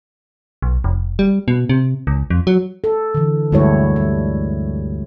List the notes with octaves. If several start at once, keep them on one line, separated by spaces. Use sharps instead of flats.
B1
F1
G3
B2
C3
C#2
F2
F#3
A4
D3 E3
D2 G2 G#3 E4 C#5
G3